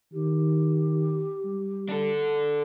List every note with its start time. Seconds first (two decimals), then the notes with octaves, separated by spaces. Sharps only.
0.13 D#3 G4
1.45 G3
1.89 D4 A4